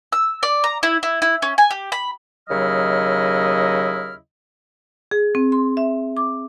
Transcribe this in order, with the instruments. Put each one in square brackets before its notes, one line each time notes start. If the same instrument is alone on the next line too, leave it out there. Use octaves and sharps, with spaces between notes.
[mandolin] E6
D5
A#5
E4
E4
E4
C#4
G#5
G4
B5
[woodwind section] D#2 C#3 F#3 E4 D#5 F6
[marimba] G#4
C4
C6
E5
D6